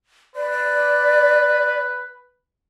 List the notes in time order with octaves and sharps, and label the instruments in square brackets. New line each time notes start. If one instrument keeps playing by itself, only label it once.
[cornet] B4 [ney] D5